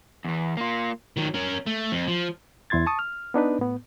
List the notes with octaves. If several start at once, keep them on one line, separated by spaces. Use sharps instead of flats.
E2 E3
A#3 F4
D#3 F#3
C#4 A#4
A3
F2
F3
E2 E4 C6 G#6 A6
A5 C#6 D#6
F6
B3 D4 D#4 B4
A2 B3